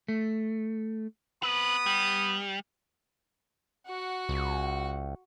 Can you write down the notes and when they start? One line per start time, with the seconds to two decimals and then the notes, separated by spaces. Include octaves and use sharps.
0.08 A3
1.43 B3 C4 B4 B5 D#6
1.86 G3
3.87 F#4 F#5
4.29 C#2